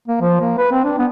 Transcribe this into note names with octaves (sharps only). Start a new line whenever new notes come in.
A#3
F3
A#3
B4
C4
D4
B3